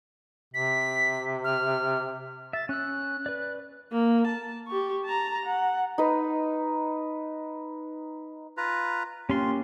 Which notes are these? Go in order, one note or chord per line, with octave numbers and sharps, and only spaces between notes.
C3 B6
F6
E5 A6
C#4 E6 F#6
B4 D5
A#3
A5
G4 C#6
A5 A#5
F#5
D#4 B4
F4 B4 A#5
A#3 C#4 F4 G4 C6